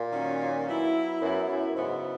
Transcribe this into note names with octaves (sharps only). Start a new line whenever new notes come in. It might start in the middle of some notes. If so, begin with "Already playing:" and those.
Already playing: A#2
D#3 F#3 C#4
F#3 B3 E4
F#2 F#3 B3 E4
F#2
G#2 C#3 F#3 B3 E4